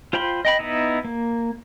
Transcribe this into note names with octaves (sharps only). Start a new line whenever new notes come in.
F4 C5 G5 B5 C6
D#5 G5 B5
B3 D#4 E4
A#3